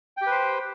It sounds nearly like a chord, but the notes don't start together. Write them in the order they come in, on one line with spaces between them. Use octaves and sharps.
G5 G4 B4 C5